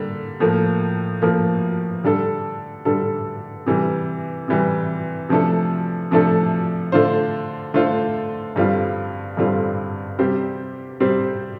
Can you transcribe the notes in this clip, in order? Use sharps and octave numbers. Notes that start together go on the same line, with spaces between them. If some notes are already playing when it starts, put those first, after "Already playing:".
Already playing: D3 G3 A#3
A2 F3 A#3
A2 F3 A#3
D3 G3 D4 A4
D3 G3 D4 A4
C3 E3 G3
C3 E3 G3
C3 F3 A3 D4 A4
C3 F3 A3 D4 A4
D3 A3 D4 F4 C5
D3 A3 D4 F4 C5
G2 D3 G3 C4 F4
G2 D3 G3 C4 F4
C3 G3 C4 G4 C5
C3 G3 C4 G4 C5